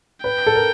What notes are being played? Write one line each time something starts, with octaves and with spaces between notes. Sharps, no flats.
B4 G5
A4
A#4